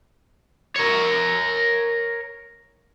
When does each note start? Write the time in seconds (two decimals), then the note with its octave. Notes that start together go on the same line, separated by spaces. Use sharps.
0.76 A#4 C#5